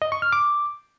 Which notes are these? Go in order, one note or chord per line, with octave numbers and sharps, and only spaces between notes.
D#5
C#6
F6
D6